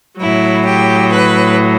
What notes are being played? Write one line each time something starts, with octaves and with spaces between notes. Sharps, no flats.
A2 F#3 E4
G4
B4